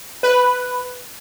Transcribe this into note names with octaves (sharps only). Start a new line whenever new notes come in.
B4